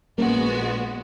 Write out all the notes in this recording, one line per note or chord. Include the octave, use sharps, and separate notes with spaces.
A#1 A#2 G#3 A#3 B3 C#4 F#4